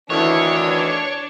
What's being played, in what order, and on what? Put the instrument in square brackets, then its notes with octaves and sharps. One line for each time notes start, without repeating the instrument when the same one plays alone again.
[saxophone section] D2 D#3 E3 [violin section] D4 [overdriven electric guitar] C#5